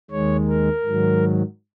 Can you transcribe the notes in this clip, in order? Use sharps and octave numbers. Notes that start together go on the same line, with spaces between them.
D#2 D#3 G#3 C#5
A#4
G#2 D#3 F#3